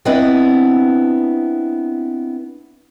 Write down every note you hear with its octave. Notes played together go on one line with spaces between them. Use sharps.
B3 C4 D4 E4 B4 D#5